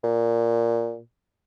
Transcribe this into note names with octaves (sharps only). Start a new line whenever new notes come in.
A#2